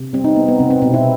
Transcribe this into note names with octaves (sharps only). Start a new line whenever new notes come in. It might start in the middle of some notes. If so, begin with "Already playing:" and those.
Already playing: C3
G3 C4
D#4
B3
B3
C3 C4
C4
B2 C4
E4